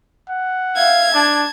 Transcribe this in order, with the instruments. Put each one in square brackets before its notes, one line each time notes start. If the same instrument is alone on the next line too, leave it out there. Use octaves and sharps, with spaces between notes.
[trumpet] F#5
[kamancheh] E5 F5 [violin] G#6
[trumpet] D4 [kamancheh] A5